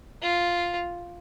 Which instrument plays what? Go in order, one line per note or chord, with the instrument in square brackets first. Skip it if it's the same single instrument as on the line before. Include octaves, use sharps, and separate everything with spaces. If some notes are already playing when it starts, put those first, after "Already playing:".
[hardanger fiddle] F4